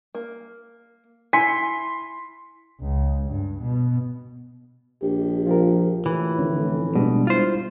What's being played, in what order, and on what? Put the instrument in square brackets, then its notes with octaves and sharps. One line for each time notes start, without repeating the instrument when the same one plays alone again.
[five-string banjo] A#3
[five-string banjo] E4 G#5 [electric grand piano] C6 B6 C#7
[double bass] C#2
G2
B2
[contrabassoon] A#1 [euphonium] G4
[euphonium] F3 [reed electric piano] F4 G4 A#4
[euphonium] A2 [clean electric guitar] E3
[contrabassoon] F1 [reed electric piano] D3 C#4
[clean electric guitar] B2 [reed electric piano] G3 G#3 D4
[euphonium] E4 [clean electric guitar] F4 C5